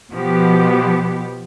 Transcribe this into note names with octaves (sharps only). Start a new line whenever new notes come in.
B2 F3 B3 G4